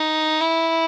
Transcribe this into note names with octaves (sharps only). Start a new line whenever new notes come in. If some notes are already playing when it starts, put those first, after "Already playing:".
Already playing: D#4
E4